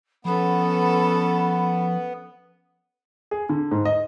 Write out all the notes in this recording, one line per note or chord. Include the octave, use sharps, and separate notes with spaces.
F3 B3 C#4 A4 B5
G#4
D3
G#2
D#5